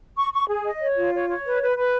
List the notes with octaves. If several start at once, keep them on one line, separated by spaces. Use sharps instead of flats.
C#6
C#6
G#4
D#5
C#5
F4
C#5
C#5
B4
B4
B4